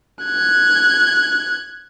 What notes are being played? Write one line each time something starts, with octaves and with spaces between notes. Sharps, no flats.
F#6 G#6